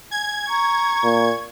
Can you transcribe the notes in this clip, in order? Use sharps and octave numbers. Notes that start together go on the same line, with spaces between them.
G#5 G#6
A#5 C#6
A#2